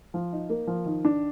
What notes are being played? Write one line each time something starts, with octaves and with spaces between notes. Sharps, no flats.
F3
D#4
A#3
F3
D#3
D4